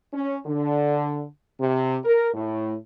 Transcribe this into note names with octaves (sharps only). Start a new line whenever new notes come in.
C#4
D3
C3
A#4
A2